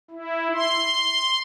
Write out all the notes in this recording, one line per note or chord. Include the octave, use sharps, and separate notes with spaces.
E4
C6